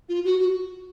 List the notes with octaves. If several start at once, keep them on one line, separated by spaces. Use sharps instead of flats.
F4
F#4
F#4